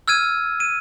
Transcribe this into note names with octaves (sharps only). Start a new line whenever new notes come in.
E6 F6 G#6 D#7
D#7